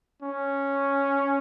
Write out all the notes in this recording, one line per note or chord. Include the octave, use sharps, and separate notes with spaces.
C#4